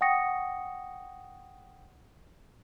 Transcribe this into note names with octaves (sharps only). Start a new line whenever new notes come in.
F#5 G5 C#6 D#6 A#6 C#7